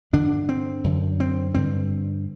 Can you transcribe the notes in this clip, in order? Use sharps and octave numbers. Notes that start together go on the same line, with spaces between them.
G2 D3 D4
C4
F#2 D3
C4
G2 D3 C4